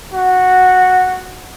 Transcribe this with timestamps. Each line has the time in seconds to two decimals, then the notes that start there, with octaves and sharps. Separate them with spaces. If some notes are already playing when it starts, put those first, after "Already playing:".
0.14 F#4